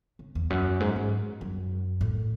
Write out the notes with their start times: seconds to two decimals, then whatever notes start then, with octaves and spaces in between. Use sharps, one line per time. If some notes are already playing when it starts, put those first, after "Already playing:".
0.19 C#3
0.35 E2
0.50 F#2
0.80 G#2
0.96 G#2
1.41 F#2
2.01 A2